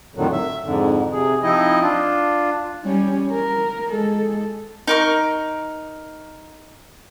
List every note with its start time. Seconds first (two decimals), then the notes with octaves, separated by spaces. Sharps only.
0.15 F2 A2 D3 D#3 F#3
0.32 E5
0.64 F2 G#2 D3
1.12 C3 G#4
1.42 F3 C4 D#4 E4 D#5
1.80 D4 F4
2.84 G3 C#4
3.31 A#4
3.91 G#3 A4
4.87 D#4 A#4 C#6